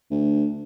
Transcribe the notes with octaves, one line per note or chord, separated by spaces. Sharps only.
D2